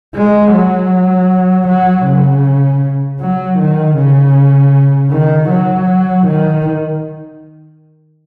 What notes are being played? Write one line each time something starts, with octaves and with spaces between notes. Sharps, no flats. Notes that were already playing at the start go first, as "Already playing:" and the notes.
G#3
F#3
F#3
C#3
F#3
D#3
C#3
D#3
F#3
D#3